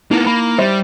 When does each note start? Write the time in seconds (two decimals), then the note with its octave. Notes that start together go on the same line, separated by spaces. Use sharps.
0.11 A#3 B3 D#4 E4
0.27 A#3 B5
0.58 G3 C5 E5 C6